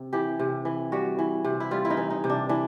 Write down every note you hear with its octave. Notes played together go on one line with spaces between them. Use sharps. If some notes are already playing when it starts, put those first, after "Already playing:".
Already playing: C3
E3 G4
C3
E3
G3 F#4
E3
C3
E4
G3 F4
E4
D#4
E3
D#4
C3
D4
E3 D4